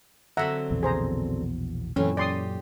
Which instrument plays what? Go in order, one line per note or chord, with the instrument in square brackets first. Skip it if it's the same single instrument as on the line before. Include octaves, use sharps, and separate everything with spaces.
[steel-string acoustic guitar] D3 F#3 C4 [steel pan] E5 F#5 A#5
[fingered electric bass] A#1 E2 B2
[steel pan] G#4 C5 A#5
[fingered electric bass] F#2 A#2 [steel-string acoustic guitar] E3 A3 C4 [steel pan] C#4
[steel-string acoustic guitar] G4 [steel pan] D5 C6 D#6